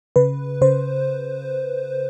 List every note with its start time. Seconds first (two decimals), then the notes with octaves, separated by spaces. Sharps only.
0.16 C#3 B4
0.61 C#3 C5